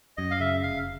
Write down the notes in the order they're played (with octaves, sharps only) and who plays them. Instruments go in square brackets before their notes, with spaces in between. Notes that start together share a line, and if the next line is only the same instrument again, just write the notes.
[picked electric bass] F#2 [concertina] D#5
[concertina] F5
[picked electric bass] C#3 [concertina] E5
[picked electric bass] F1 [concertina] F5